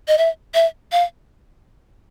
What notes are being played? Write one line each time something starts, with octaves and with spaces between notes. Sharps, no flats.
D#5
E5
E5
F5